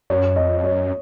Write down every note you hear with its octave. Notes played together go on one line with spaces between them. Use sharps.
F#2 C#5
F2 D#5
F#2 C#5